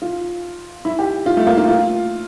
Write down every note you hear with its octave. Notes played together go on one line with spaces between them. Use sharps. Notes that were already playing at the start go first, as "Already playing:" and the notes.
F4
E4
G4
F4
A3
A#3
F4
F4